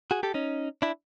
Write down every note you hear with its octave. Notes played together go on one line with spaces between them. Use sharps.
F#4 G#4
G4 A4
C#4 D#4
D4 E4